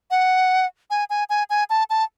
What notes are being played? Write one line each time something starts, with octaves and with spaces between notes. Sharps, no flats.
F#5
G#5
G#5
G#5
G#5
A5
A5